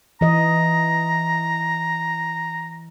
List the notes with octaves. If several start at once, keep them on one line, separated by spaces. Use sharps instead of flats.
E3 D#5 A#5